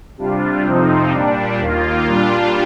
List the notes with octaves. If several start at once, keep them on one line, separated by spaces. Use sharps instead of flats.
C3 G3 D4 F4
F2 C3 F3 C4 D#4
A#2 G3 D4
D#2 D#3 A#3 F4
A#2 G3 D4 F4